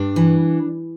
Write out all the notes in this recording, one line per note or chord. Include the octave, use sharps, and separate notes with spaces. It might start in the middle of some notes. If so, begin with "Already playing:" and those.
Already playing: G2 D4
E3